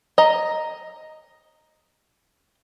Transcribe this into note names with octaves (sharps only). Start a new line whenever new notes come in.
D#5 A#5